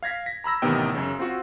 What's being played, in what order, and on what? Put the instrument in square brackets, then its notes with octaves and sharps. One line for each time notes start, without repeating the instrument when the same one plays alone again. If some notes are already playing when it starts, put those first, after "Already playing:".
[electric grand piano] F5 G#6 A#6 B6
A#6 B6
A#5 B5 E6 A#6
A1 C3 D#3 B3 D#5 G5
F#2 C#3
C4 F4 F#4